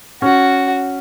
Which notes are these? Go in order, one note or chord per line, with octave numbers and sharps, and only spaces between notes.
C#4 F#4